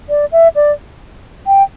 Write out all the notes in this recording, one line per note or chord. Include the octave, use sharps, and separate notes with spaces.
D5
E5
D5
G5